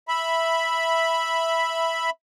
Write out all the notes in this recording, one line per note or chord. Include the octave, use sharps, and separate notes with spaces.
E5 B5